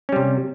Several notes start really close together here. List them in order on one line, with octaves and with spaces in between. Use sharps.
C#4 G3 C3